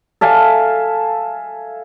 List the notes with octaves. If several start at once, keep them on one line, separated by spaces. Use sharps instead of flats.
A4 E5 F5 G#5